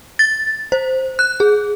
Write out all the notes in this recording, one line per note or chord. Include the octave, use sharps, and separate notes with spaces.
A6
C5
F#6
G#4